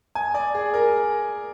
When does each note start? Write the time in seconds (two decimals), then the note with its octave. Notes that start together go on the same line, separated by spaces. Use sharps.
0.15 G#5
0.34 D5
0.55 G#4
0.74 A#4